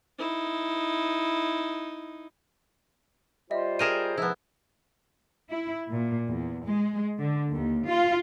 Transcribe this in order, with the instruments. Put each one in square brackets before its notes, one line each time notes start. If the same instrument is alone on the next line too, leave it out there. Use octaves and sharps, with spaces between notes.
[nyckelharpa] D#4 E4
[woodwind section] G3 F4 C5 [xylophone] D#5 E5
[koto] G#4 A#4 G5 [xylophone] D#7 E7
[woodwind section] G#2 C3 F3 [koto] B3 E4
[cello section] E4
A#2
E2
G#3
D3
D#2
F4